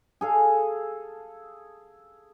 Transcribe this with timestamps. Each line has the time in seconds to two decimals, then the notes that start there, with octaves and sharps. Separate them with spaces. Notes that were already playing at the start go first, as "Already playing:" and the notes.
0.21 G#4 A4 F5